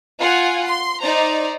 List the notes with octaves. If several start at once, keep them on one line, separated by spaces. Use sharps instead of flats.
F4 F#5 G#5
C6
D#4 C5 D5 A#5